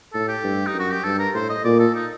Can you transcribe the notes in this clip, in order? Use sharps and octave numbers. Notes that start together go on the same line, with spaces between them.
A2 A4
G4
G2
D#4
F#2
F#4
G4
G2 A4
A#4
A2 C5
D#5
A#2 D5
A4
D#4